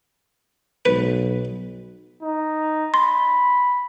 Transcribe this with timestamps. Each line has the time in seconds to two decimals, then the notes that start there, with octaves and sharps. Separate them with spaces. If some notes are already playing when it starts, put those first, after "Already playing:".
0.85 B1 B4
2.23 D#4
2.94 B5 C6